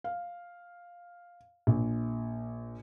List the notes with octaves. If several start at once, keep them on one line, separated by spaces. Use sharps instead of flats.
F5
A#1